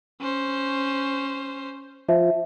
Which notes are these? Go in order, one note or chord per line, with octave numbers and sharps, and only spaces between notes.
C#4 C5
F3 E5